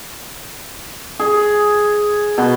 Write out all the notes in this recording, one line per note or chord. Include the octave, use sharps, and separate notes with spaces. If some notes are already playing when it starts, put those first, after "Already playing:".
G#4
B2